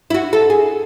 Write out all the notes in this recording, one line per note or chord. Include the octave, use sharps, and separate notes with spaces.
E4
F#4
A4
G#4